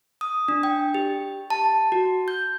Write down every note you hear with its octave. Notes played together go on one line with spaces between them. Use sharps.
D#6
D4
G5
G4
A5
F#4
G6